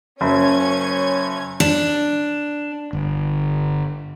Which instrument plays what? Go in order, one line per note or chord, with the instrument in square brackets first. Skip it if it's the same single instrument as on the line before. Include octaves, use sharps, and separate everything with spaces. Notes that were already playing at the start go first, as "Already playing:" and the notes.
[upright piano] F#1 [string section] C#4 G#6
[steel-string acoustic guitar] D4
[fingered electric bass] G1